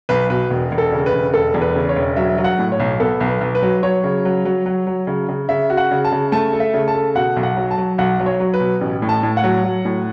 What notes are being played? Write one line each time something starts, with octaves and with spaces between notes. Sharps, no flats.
B1 B4
B2 B4
E1
E1
A4
C#3
B4
E1
E1 A4
E2
B4
C#3
C#5
E1
F#3 E5
F#3
F#5
A2
C#5
B1
B3 A4
B1
B4
B1
B4
F#3
F#3 C#5
C#3
F#3
F#3
F#3
F#3
C#3
C#3
C#3 E5
F#4
F#5
C#3
A5
C#3
A3 A5
A4
E5
C#3
A5
A4
B2 F#5
B1
F#5
F#3
A5
F#3
B1 F#5
F#3
C#5
F#3
B4
B2
A1
A2
A5
A2
F#5
F#3
F#3
A2